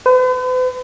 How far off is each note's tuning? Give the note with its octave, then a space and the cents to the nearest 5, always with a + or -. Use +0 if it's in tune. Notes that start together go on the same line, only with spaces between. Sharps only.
B4 +45